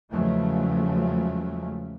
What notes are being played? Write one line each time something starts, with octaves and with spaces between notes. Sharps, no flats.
E2 C#3 F3 F#3 G#3 A3